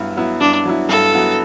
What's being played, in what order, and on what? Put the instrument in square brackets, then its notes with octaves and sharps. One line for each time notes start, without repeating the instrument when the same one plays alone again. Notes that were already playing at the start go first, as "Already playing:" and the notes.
Already playing: [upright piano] G2 F#3 B3 E4
F#3 B3 E4
[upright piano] G2 [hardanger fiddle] D4
[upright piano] F#3 B3 E4
[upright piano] G2 [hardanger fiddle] A4
[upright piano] F#3 B3 E4